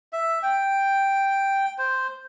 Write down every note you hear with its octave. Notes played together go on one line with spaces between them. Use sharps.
E5
G5
C5